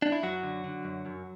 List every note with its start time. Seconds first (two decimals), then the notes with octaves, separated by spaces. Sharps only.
0.02 D4
0.12 E4
0.23 F#2 F#3 F#4
0.43 D3
0.64 D3
0.84 F#2
1.06 F#2